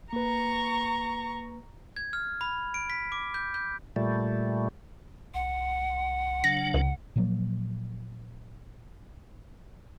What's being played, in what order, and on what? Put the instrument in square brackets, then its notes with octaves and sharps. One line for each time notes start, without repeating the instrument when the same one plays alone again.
[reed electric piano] A#3 B4 [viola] A#5 C#6
[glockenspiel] G#6
F6
B5
D7
B6
D6
G6
G6
[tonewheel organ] A#2 G3 A3
[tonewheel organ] C2 [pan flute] F#5
[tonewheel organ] C#3 F#3 D4 [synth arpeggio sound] A#6
[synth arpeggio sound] C#2
[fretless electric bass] A#2 F3 F#3 A#3